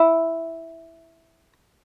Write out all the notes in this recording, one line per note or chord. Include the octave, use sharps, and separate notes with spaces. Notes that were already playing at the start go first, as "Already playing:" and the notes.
Already playing: E4